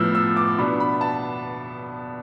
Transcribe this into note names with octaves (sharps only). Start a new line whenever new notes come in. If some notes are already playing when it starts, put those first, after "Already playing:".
Already playing: A2 F3 B3 E6 F6
E6
D6
B2 B3 D4 B5
B5
A5